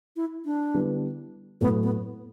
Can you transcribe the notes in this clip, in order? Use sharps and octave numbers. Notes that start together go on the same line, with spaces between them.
E4
D4
D3 G3 B3 E4 B4
A2 F#3 A3 B3
B3